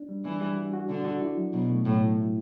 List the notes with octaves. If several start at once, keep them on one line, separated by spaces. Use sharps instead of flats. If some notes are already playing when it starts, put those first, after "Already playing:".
Already playing: D4
G3
E3 D4
G3
F#4
F#4
D3 D4
F#4
E4
F#3
B2 F#3
A3
A2 F#3
E4
E4